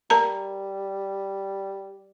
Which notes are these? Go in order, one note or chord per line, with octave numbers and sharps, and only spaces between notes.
G3 A#4 A5 A#5